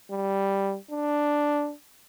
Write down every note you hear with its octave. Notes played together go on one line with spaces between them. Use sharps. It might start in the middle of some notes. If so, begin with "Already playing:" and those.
G3
D4